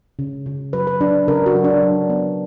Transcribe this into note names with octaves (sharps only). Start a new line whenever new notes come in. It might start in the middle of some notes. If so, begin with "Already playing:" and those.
C#3
C#3
F#3 B4
B4
F#3 D4
C#3 A#4
F#4
F#3
D4
F#3
B3